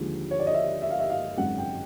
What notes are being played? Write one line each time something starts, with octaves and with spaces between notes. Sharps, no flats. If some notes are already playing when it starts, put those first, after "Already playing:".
Already playing: D#2 D3 F3 G#3
C#5
D5
D#5
E5
E5
F5
E5
F5
G#1 F#2 C#3 F#5
G5